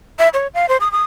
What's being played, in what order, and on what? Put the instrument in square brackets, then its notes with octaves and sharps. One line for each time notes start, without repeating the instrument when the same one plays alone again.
[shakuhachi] E5
C#5
F5
C5
D#6
D#6